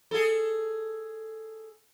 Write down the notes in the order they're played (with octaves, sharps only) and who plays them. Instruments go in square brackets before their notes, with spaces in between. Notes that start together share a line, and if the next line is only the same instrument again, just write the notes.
[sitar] G#4 A4